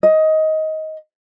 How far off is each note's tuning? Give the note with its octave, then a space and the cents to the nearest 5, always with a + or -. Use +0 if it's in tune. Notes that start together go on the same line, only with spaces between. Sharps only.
D#5 +15